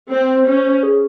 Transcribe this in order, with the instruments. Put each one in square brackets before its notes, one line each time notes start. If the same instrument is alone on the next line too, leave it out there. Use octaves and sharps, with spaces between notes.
[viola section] C4 [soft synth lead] C5
[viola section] C#4
[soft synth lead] G#4